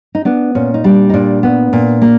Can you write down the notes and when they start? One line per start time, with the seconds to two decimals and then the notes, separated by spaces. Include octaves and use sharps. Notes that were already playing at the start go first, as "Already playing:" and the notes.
0.15 D#4
0.25 B3 D4
0.55 A#2 C#4
0.74 D#4
0.84 G3 D4
1.09 D#4
1.14 A#2 D4
1.43 B3
1.73 A#2
2.02 A#3